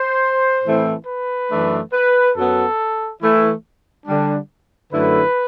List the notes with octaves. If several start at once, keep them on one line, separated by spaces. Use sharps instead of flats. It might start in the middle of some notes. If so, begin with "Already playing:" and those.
Already playing: C5
A2 E3 A3 C4 E4
B4
F#2 E3 A3 D4
B4
F#2 F#3 B3 A4
E3 A3 E4
D3 G3 D4
F#2 D3 A3 E4 B4